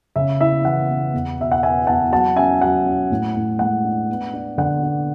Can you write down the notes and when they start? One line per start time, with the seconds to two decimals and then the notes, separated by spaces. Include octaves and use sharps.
0.16 C#3 E5
0.41 E4 E5
0.65 E3 F#5
0.89 B3
1.13 E2
1.38 B2 E5
1.52 F#5
1.63 B3 E5 G#5
1.87 E2 F#5 A5
2.12 F#3 F#5 A5
2.36 C#4 E5 G#5
2.62 F#3 F#5
2.86 C#4
3.11 A2
3.36 A2
3.59 G#3 F#5
3.85 D4
4.09 B3
4.34 D4
4.58 D3 F#5
4.83 D4